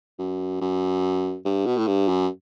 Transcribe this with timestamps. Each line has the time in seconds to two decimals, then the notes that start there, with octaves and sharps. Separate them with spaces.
0.19 F#2
0.61 F#2
1.45 G2
1.66 B2
1.78 A2
1.87 G2
2.08 F#2